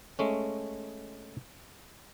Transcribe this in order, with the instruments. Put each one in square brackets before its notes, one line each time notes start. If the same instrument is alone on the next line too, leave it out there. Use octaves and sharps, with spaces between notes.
[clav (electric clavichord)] G#3 A3 C#4